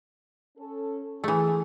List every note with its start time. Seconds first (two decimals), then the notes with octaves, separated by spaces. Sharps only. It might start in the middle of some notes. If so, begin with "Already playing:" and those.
0.58 C#4 A4
1.24 E3 A3 G#4